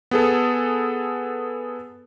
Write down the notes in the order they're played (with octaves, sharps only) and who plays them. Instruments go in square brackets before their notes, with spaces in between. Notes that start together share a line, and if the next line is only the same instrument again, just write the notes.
[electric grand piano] B3 G#4 A4